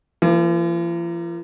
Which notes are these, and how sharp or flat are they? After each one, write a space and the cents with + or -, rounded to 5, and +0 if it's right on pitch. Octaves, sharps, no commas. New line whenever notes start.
F3 -45 A#3 +0